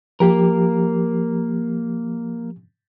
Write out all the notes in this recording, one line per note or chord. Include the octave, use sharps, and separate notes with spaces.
F3 A#3 G4 A#4